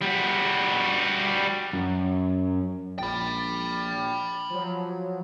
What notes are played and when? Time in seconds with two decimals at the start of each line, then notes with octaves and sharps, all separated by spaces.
0.01 G3 F#4
1.73 F#2
2.99 A#1 G5 B5 A6
4.50 F3 F#3